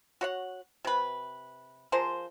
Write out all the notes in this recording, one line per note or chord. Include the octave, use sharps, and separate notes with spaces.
F#4 C#5 F#5
C3 B4
F3 G#4 A#4 C5